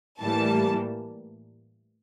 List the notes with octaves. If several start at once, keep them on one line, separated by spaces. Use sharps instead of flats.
A2 E3 G3 A#3 A5